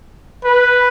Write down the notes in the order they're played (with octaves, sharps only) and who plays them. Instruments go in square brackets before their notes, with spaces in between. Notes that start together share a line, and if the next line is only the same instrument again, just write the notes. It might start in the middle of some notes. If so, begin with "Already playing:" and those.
[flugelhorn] B4